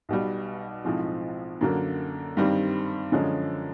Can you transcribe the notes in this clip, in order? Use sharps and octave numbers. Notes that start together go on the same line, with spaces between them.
B1 B2 G3
B1 A2 F3 G#3 C4
F#2 D3 F#3 A#3
G2 D#3 G3 C4
F#2 D3 F3 G#3 C#4